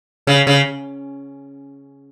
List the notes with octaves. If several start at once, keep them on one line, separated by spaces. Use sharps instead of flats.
C#3
C#3